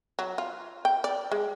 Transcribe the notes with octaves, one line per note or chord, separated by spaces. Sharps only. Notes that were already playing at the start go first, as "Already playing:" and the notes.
F#3
F4
G5
D5
G#3